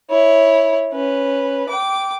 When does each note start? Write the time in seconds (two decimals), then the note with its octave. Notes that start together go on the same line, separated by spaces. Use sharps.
0.10 E4 C#5
0.92 C#4 B4
1.69 G5 D6